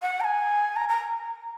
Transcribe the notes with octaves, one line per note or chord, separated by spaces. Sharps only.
F#5
A#5
G#5
A#5
A#5